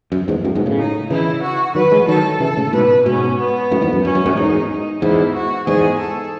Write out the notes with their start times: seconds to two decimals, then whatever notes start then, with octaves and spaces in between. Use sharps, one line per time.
0.12 F#2
0.28 E2 G#2
0.45 F#2 A2
0.55 G#2 B2
0.66 A2 C#3
0.78 D#4
1.10 C#3 E3 E4
1.43 F#4
1.75 D#3 F#3 B4
1.91 E3 G#3
2.08 D#3 F#3 A4
2.40 C#3 E3 A4
2.57 A2 C#3
2.73 G#2 B2 B4
3.06 G#2 B2 C#4
3.38 B3
3.71 F#2 A2
3.82 E2 G#2
3.93 F#2
4.04 F#2 C#4
4.15 F#2
4.26 F#2 A2
4.37 E2 G#2 D#4
4.70 D#4
5.02 E2 G#2 E4
5.35 F#4
5.67 E2 G#2 G#4
6.00 A4